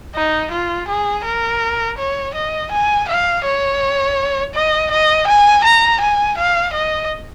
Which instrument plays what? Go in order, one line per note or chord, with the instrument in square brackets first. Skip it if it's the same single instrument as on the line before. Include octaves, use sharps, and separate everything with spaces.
[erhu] D#4
F4
G#4
A#4
C#5
D#5
G#5
F5
C#5
D#5
D#5
G#5
A#5
G#5
F5
D#5